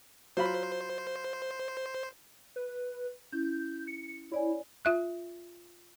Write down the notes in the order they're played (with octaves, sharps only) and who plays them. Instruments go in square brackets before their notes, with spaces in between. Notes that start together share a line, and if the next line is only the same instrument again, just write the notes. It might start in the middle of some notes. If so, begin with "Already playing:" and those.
[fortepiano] F#3 F4 B5 [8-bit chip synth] C5
[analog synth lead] B4
[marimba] C#4 E4 [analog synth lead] G6
[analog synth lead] C#7
[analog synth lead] E4 [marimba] C#5 D5 G#5
[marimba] F4 E5 F#6